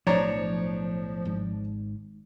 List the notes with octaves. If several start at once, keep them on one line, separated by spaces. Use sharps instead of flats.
B1 A2 F3 D4 C#5 A#5
G#1 G#2